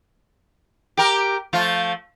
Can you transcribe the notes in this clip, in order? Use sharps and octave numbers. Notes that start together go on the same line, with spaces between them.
G4 A#4
F3 A3 F4